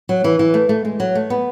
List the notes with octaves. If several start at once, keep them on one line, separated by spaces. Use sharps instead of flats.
F#3
E3
E3
A3
A3
G#3
F#3
A3
B3